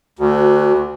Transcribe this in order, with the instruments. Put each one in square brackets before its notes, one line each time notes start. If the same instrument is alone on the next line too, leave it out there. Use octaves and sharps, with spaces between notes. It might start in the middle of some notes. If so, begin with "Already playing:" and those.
[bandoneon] D2 [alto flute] F#4